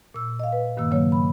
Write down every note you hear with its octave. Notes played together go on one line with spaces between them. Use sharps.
A#2 E6
D#5 F5
B4
G2 D#3 A#3 E6
C#3 F#3 A#3 C#5
B5